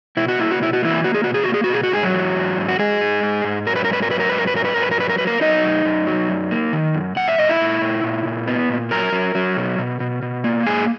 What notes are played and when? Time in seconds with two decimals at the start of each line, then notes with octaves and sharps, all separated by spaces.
0.17 B2 E4
0.28 F#4
0.39 A#3 E4
0.51 F#4
0.61 B2 E4
0.73 F#4
0.83 E3 A#3 E4
1.04 A#3 F#4
1.14 G#4
1.24 B2 F#4
1.34 G#4
1.44 A#3 F#4
1.54 G#4
1.64 F#4
1.69 B2 G#4
1.83 F#4
1.92 G#2 G#4
2.03 F#3 F#4
2.14 E3
2.35 G#2
2.57 G#2
2.69 F#4
2.79 G#2 G#3 G#4
3.01 G#2
3.23 G#2
3.44 G#2
3.67 F#3 A#4
3.76 B4
3.85 A#4
3.88 G#2 B4
4.02 A#4
4.10 F#3 B4
4.20 A#4
4.29 G#2 B4
4.38 A#4
4.47 B4
4.54 F#3 A#4
4.65 B4
4.74 G#2 A#4
4.83 B4
4.91 A#4
4.98 F#3 B4
5.09 A#4
5.18 F#3 B4
5.27 A#3 A#4
5.41 F#3 D#4 D#5
5.64 F#2
5.85 F#2
6.07 F#3
6.29 F#2
6.51 A#3
6.73 D#3
6.95 F#2
7.16 A#2 F#5
7.28 E5
7.38 A#2 D#5
7.49 E4 E5
7.60 A#2
7.82 A#2
8.04 A#2
8.25 A#2
8.48 B3
8.69 A#2
8.91 F#3 A#4 A#5
9.13 F#3
9.35 F#3
9.57 B2
9.79 B2
10.00 B2
10.22 B2
10.44 A#3
10.66 G#2 G#4 G#5